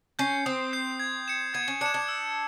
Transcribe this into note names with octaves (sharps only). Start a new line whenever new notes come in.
C#4 G6 C7
C4 D#6
G6 C7
G#6
C#7 E7
B3 G#6
C#4
D4 C#7 E7
D4
E6